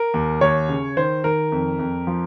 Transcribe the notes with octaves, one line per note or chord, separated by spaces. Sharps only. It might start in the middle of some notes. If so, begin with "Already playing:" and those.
Already playing: A#4
D#2
D#2 C#5
C#3
D#3 C5
D#3 A#4
F2
F2
F3